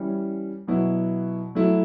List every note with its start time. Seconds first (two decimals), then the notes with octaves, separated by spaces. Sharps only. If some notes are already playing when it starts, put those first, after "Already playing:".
Already playing: E3 G3 C#4
0.67 B2 F#3 B3 E4
1.55 F#3 A3 E4